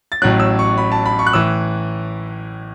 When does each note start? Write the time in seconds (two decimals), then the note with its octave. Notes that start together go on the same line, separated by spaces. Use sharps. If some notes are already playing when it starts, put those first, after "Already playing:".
0.12 A6
0.22 A1 A2 F#3 F#6
0.40 E6
0.59 C#6
0.78 B5
0.92 A5
1.06 B5
1.19 C#6
1.27 F#6
1.33 A2 E3 E6